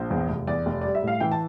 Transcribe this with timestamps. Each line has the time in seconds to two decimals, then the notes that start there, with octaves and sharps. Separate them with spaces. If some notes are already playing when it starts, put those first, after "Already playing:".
Already playing: A#1 C5
0.11 E2
0.29 F1
0.47 E2 D5
0.66 F1
0.81 G3 D5
0.95 E5
1.03 A2 F5
1.20 E3 G5
1.32 A5